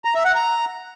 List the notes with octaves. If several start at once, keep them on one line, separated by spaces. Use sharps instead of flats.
A#5
E5
F#5
A#5